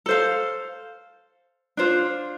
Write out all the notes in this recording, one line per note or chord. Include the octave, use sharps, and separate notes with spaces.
A4 C5 F5
D4 F4 C5